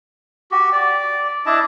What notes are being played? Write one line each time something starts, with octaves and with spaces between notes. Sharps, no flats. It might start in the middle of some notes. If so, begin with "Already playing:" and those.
F#4 G4
D5
D4 E4 D#5 A5